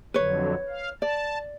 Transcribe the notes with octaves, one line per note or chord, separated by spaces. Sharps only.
F2 D3 F#3 B4 C#5
F5
D5 A5